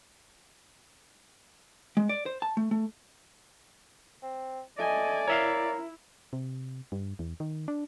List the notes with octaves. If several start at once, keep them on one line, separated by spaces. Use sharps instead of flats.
G#3
D5
C5
A5
A3
A3
C4
A3 D5 D#5 G#5
E4 A#4 C#5 E5 F5
C3
G2
E2
D#3
D4